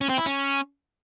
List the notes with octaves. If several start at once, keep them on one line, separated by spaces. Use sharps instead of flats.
C#4
C4
E4
C#4